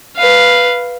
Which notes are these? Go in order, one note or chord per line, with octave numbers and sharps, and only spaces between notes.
B4 F5